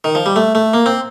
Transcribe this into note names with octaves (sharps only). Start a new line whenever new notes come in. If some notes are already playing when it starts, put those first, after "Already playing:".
D#3
F3
G3
A3
A3
A#3
C4